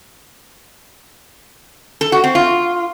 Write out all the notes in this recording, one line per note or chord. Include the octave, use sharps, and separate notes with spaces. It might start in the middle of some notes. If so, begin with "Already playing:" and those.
A4
F#4
C4
F4